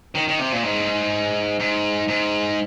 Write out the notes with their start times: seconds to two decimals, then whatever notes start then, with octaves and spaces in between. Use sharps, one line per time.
0.15 D#3
0.28 D#3
0.39 C3
0.51 A#2
0.63 G#2
1.60 G#2
2.08 G#2